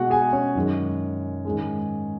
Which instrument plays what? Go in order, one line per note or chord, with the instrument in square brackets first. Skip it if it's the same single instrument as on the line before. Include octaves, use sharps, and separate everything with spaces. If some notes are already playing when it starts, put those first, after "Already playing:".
Already playing: [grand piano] B2 G#3 F#4 F#5
G#4 G#5
C#4 C#5
F#2 D#3 G#3
G#2 D#3 G#3